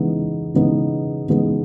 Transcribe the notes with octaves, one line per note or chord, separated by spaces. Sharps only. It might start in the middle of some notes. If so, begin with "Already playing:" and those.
Already playing: C#3 E3 G#3 B3 D#4
C#3 E3 G#3 B3 D#4
C#3 E3 G#3 B3 D#4